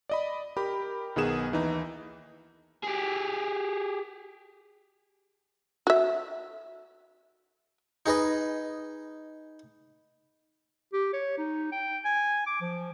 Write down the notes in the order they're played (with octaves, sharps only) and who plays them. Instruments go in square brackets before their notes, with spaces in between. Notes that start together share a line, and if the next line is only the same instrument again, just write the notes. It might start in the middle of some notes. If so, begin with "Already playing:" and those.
[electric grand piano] D5 D#5 B5
G4 A#4 B5
B1 D#3 B3 G#4 E7
D#2 E3 D#4
[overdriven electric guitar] G4 G#4
[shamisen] F#4 E5
[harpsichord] D#4 G#4 B4 D#5
[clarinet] G4
C#5
D#4
G5
G#5
D6
F3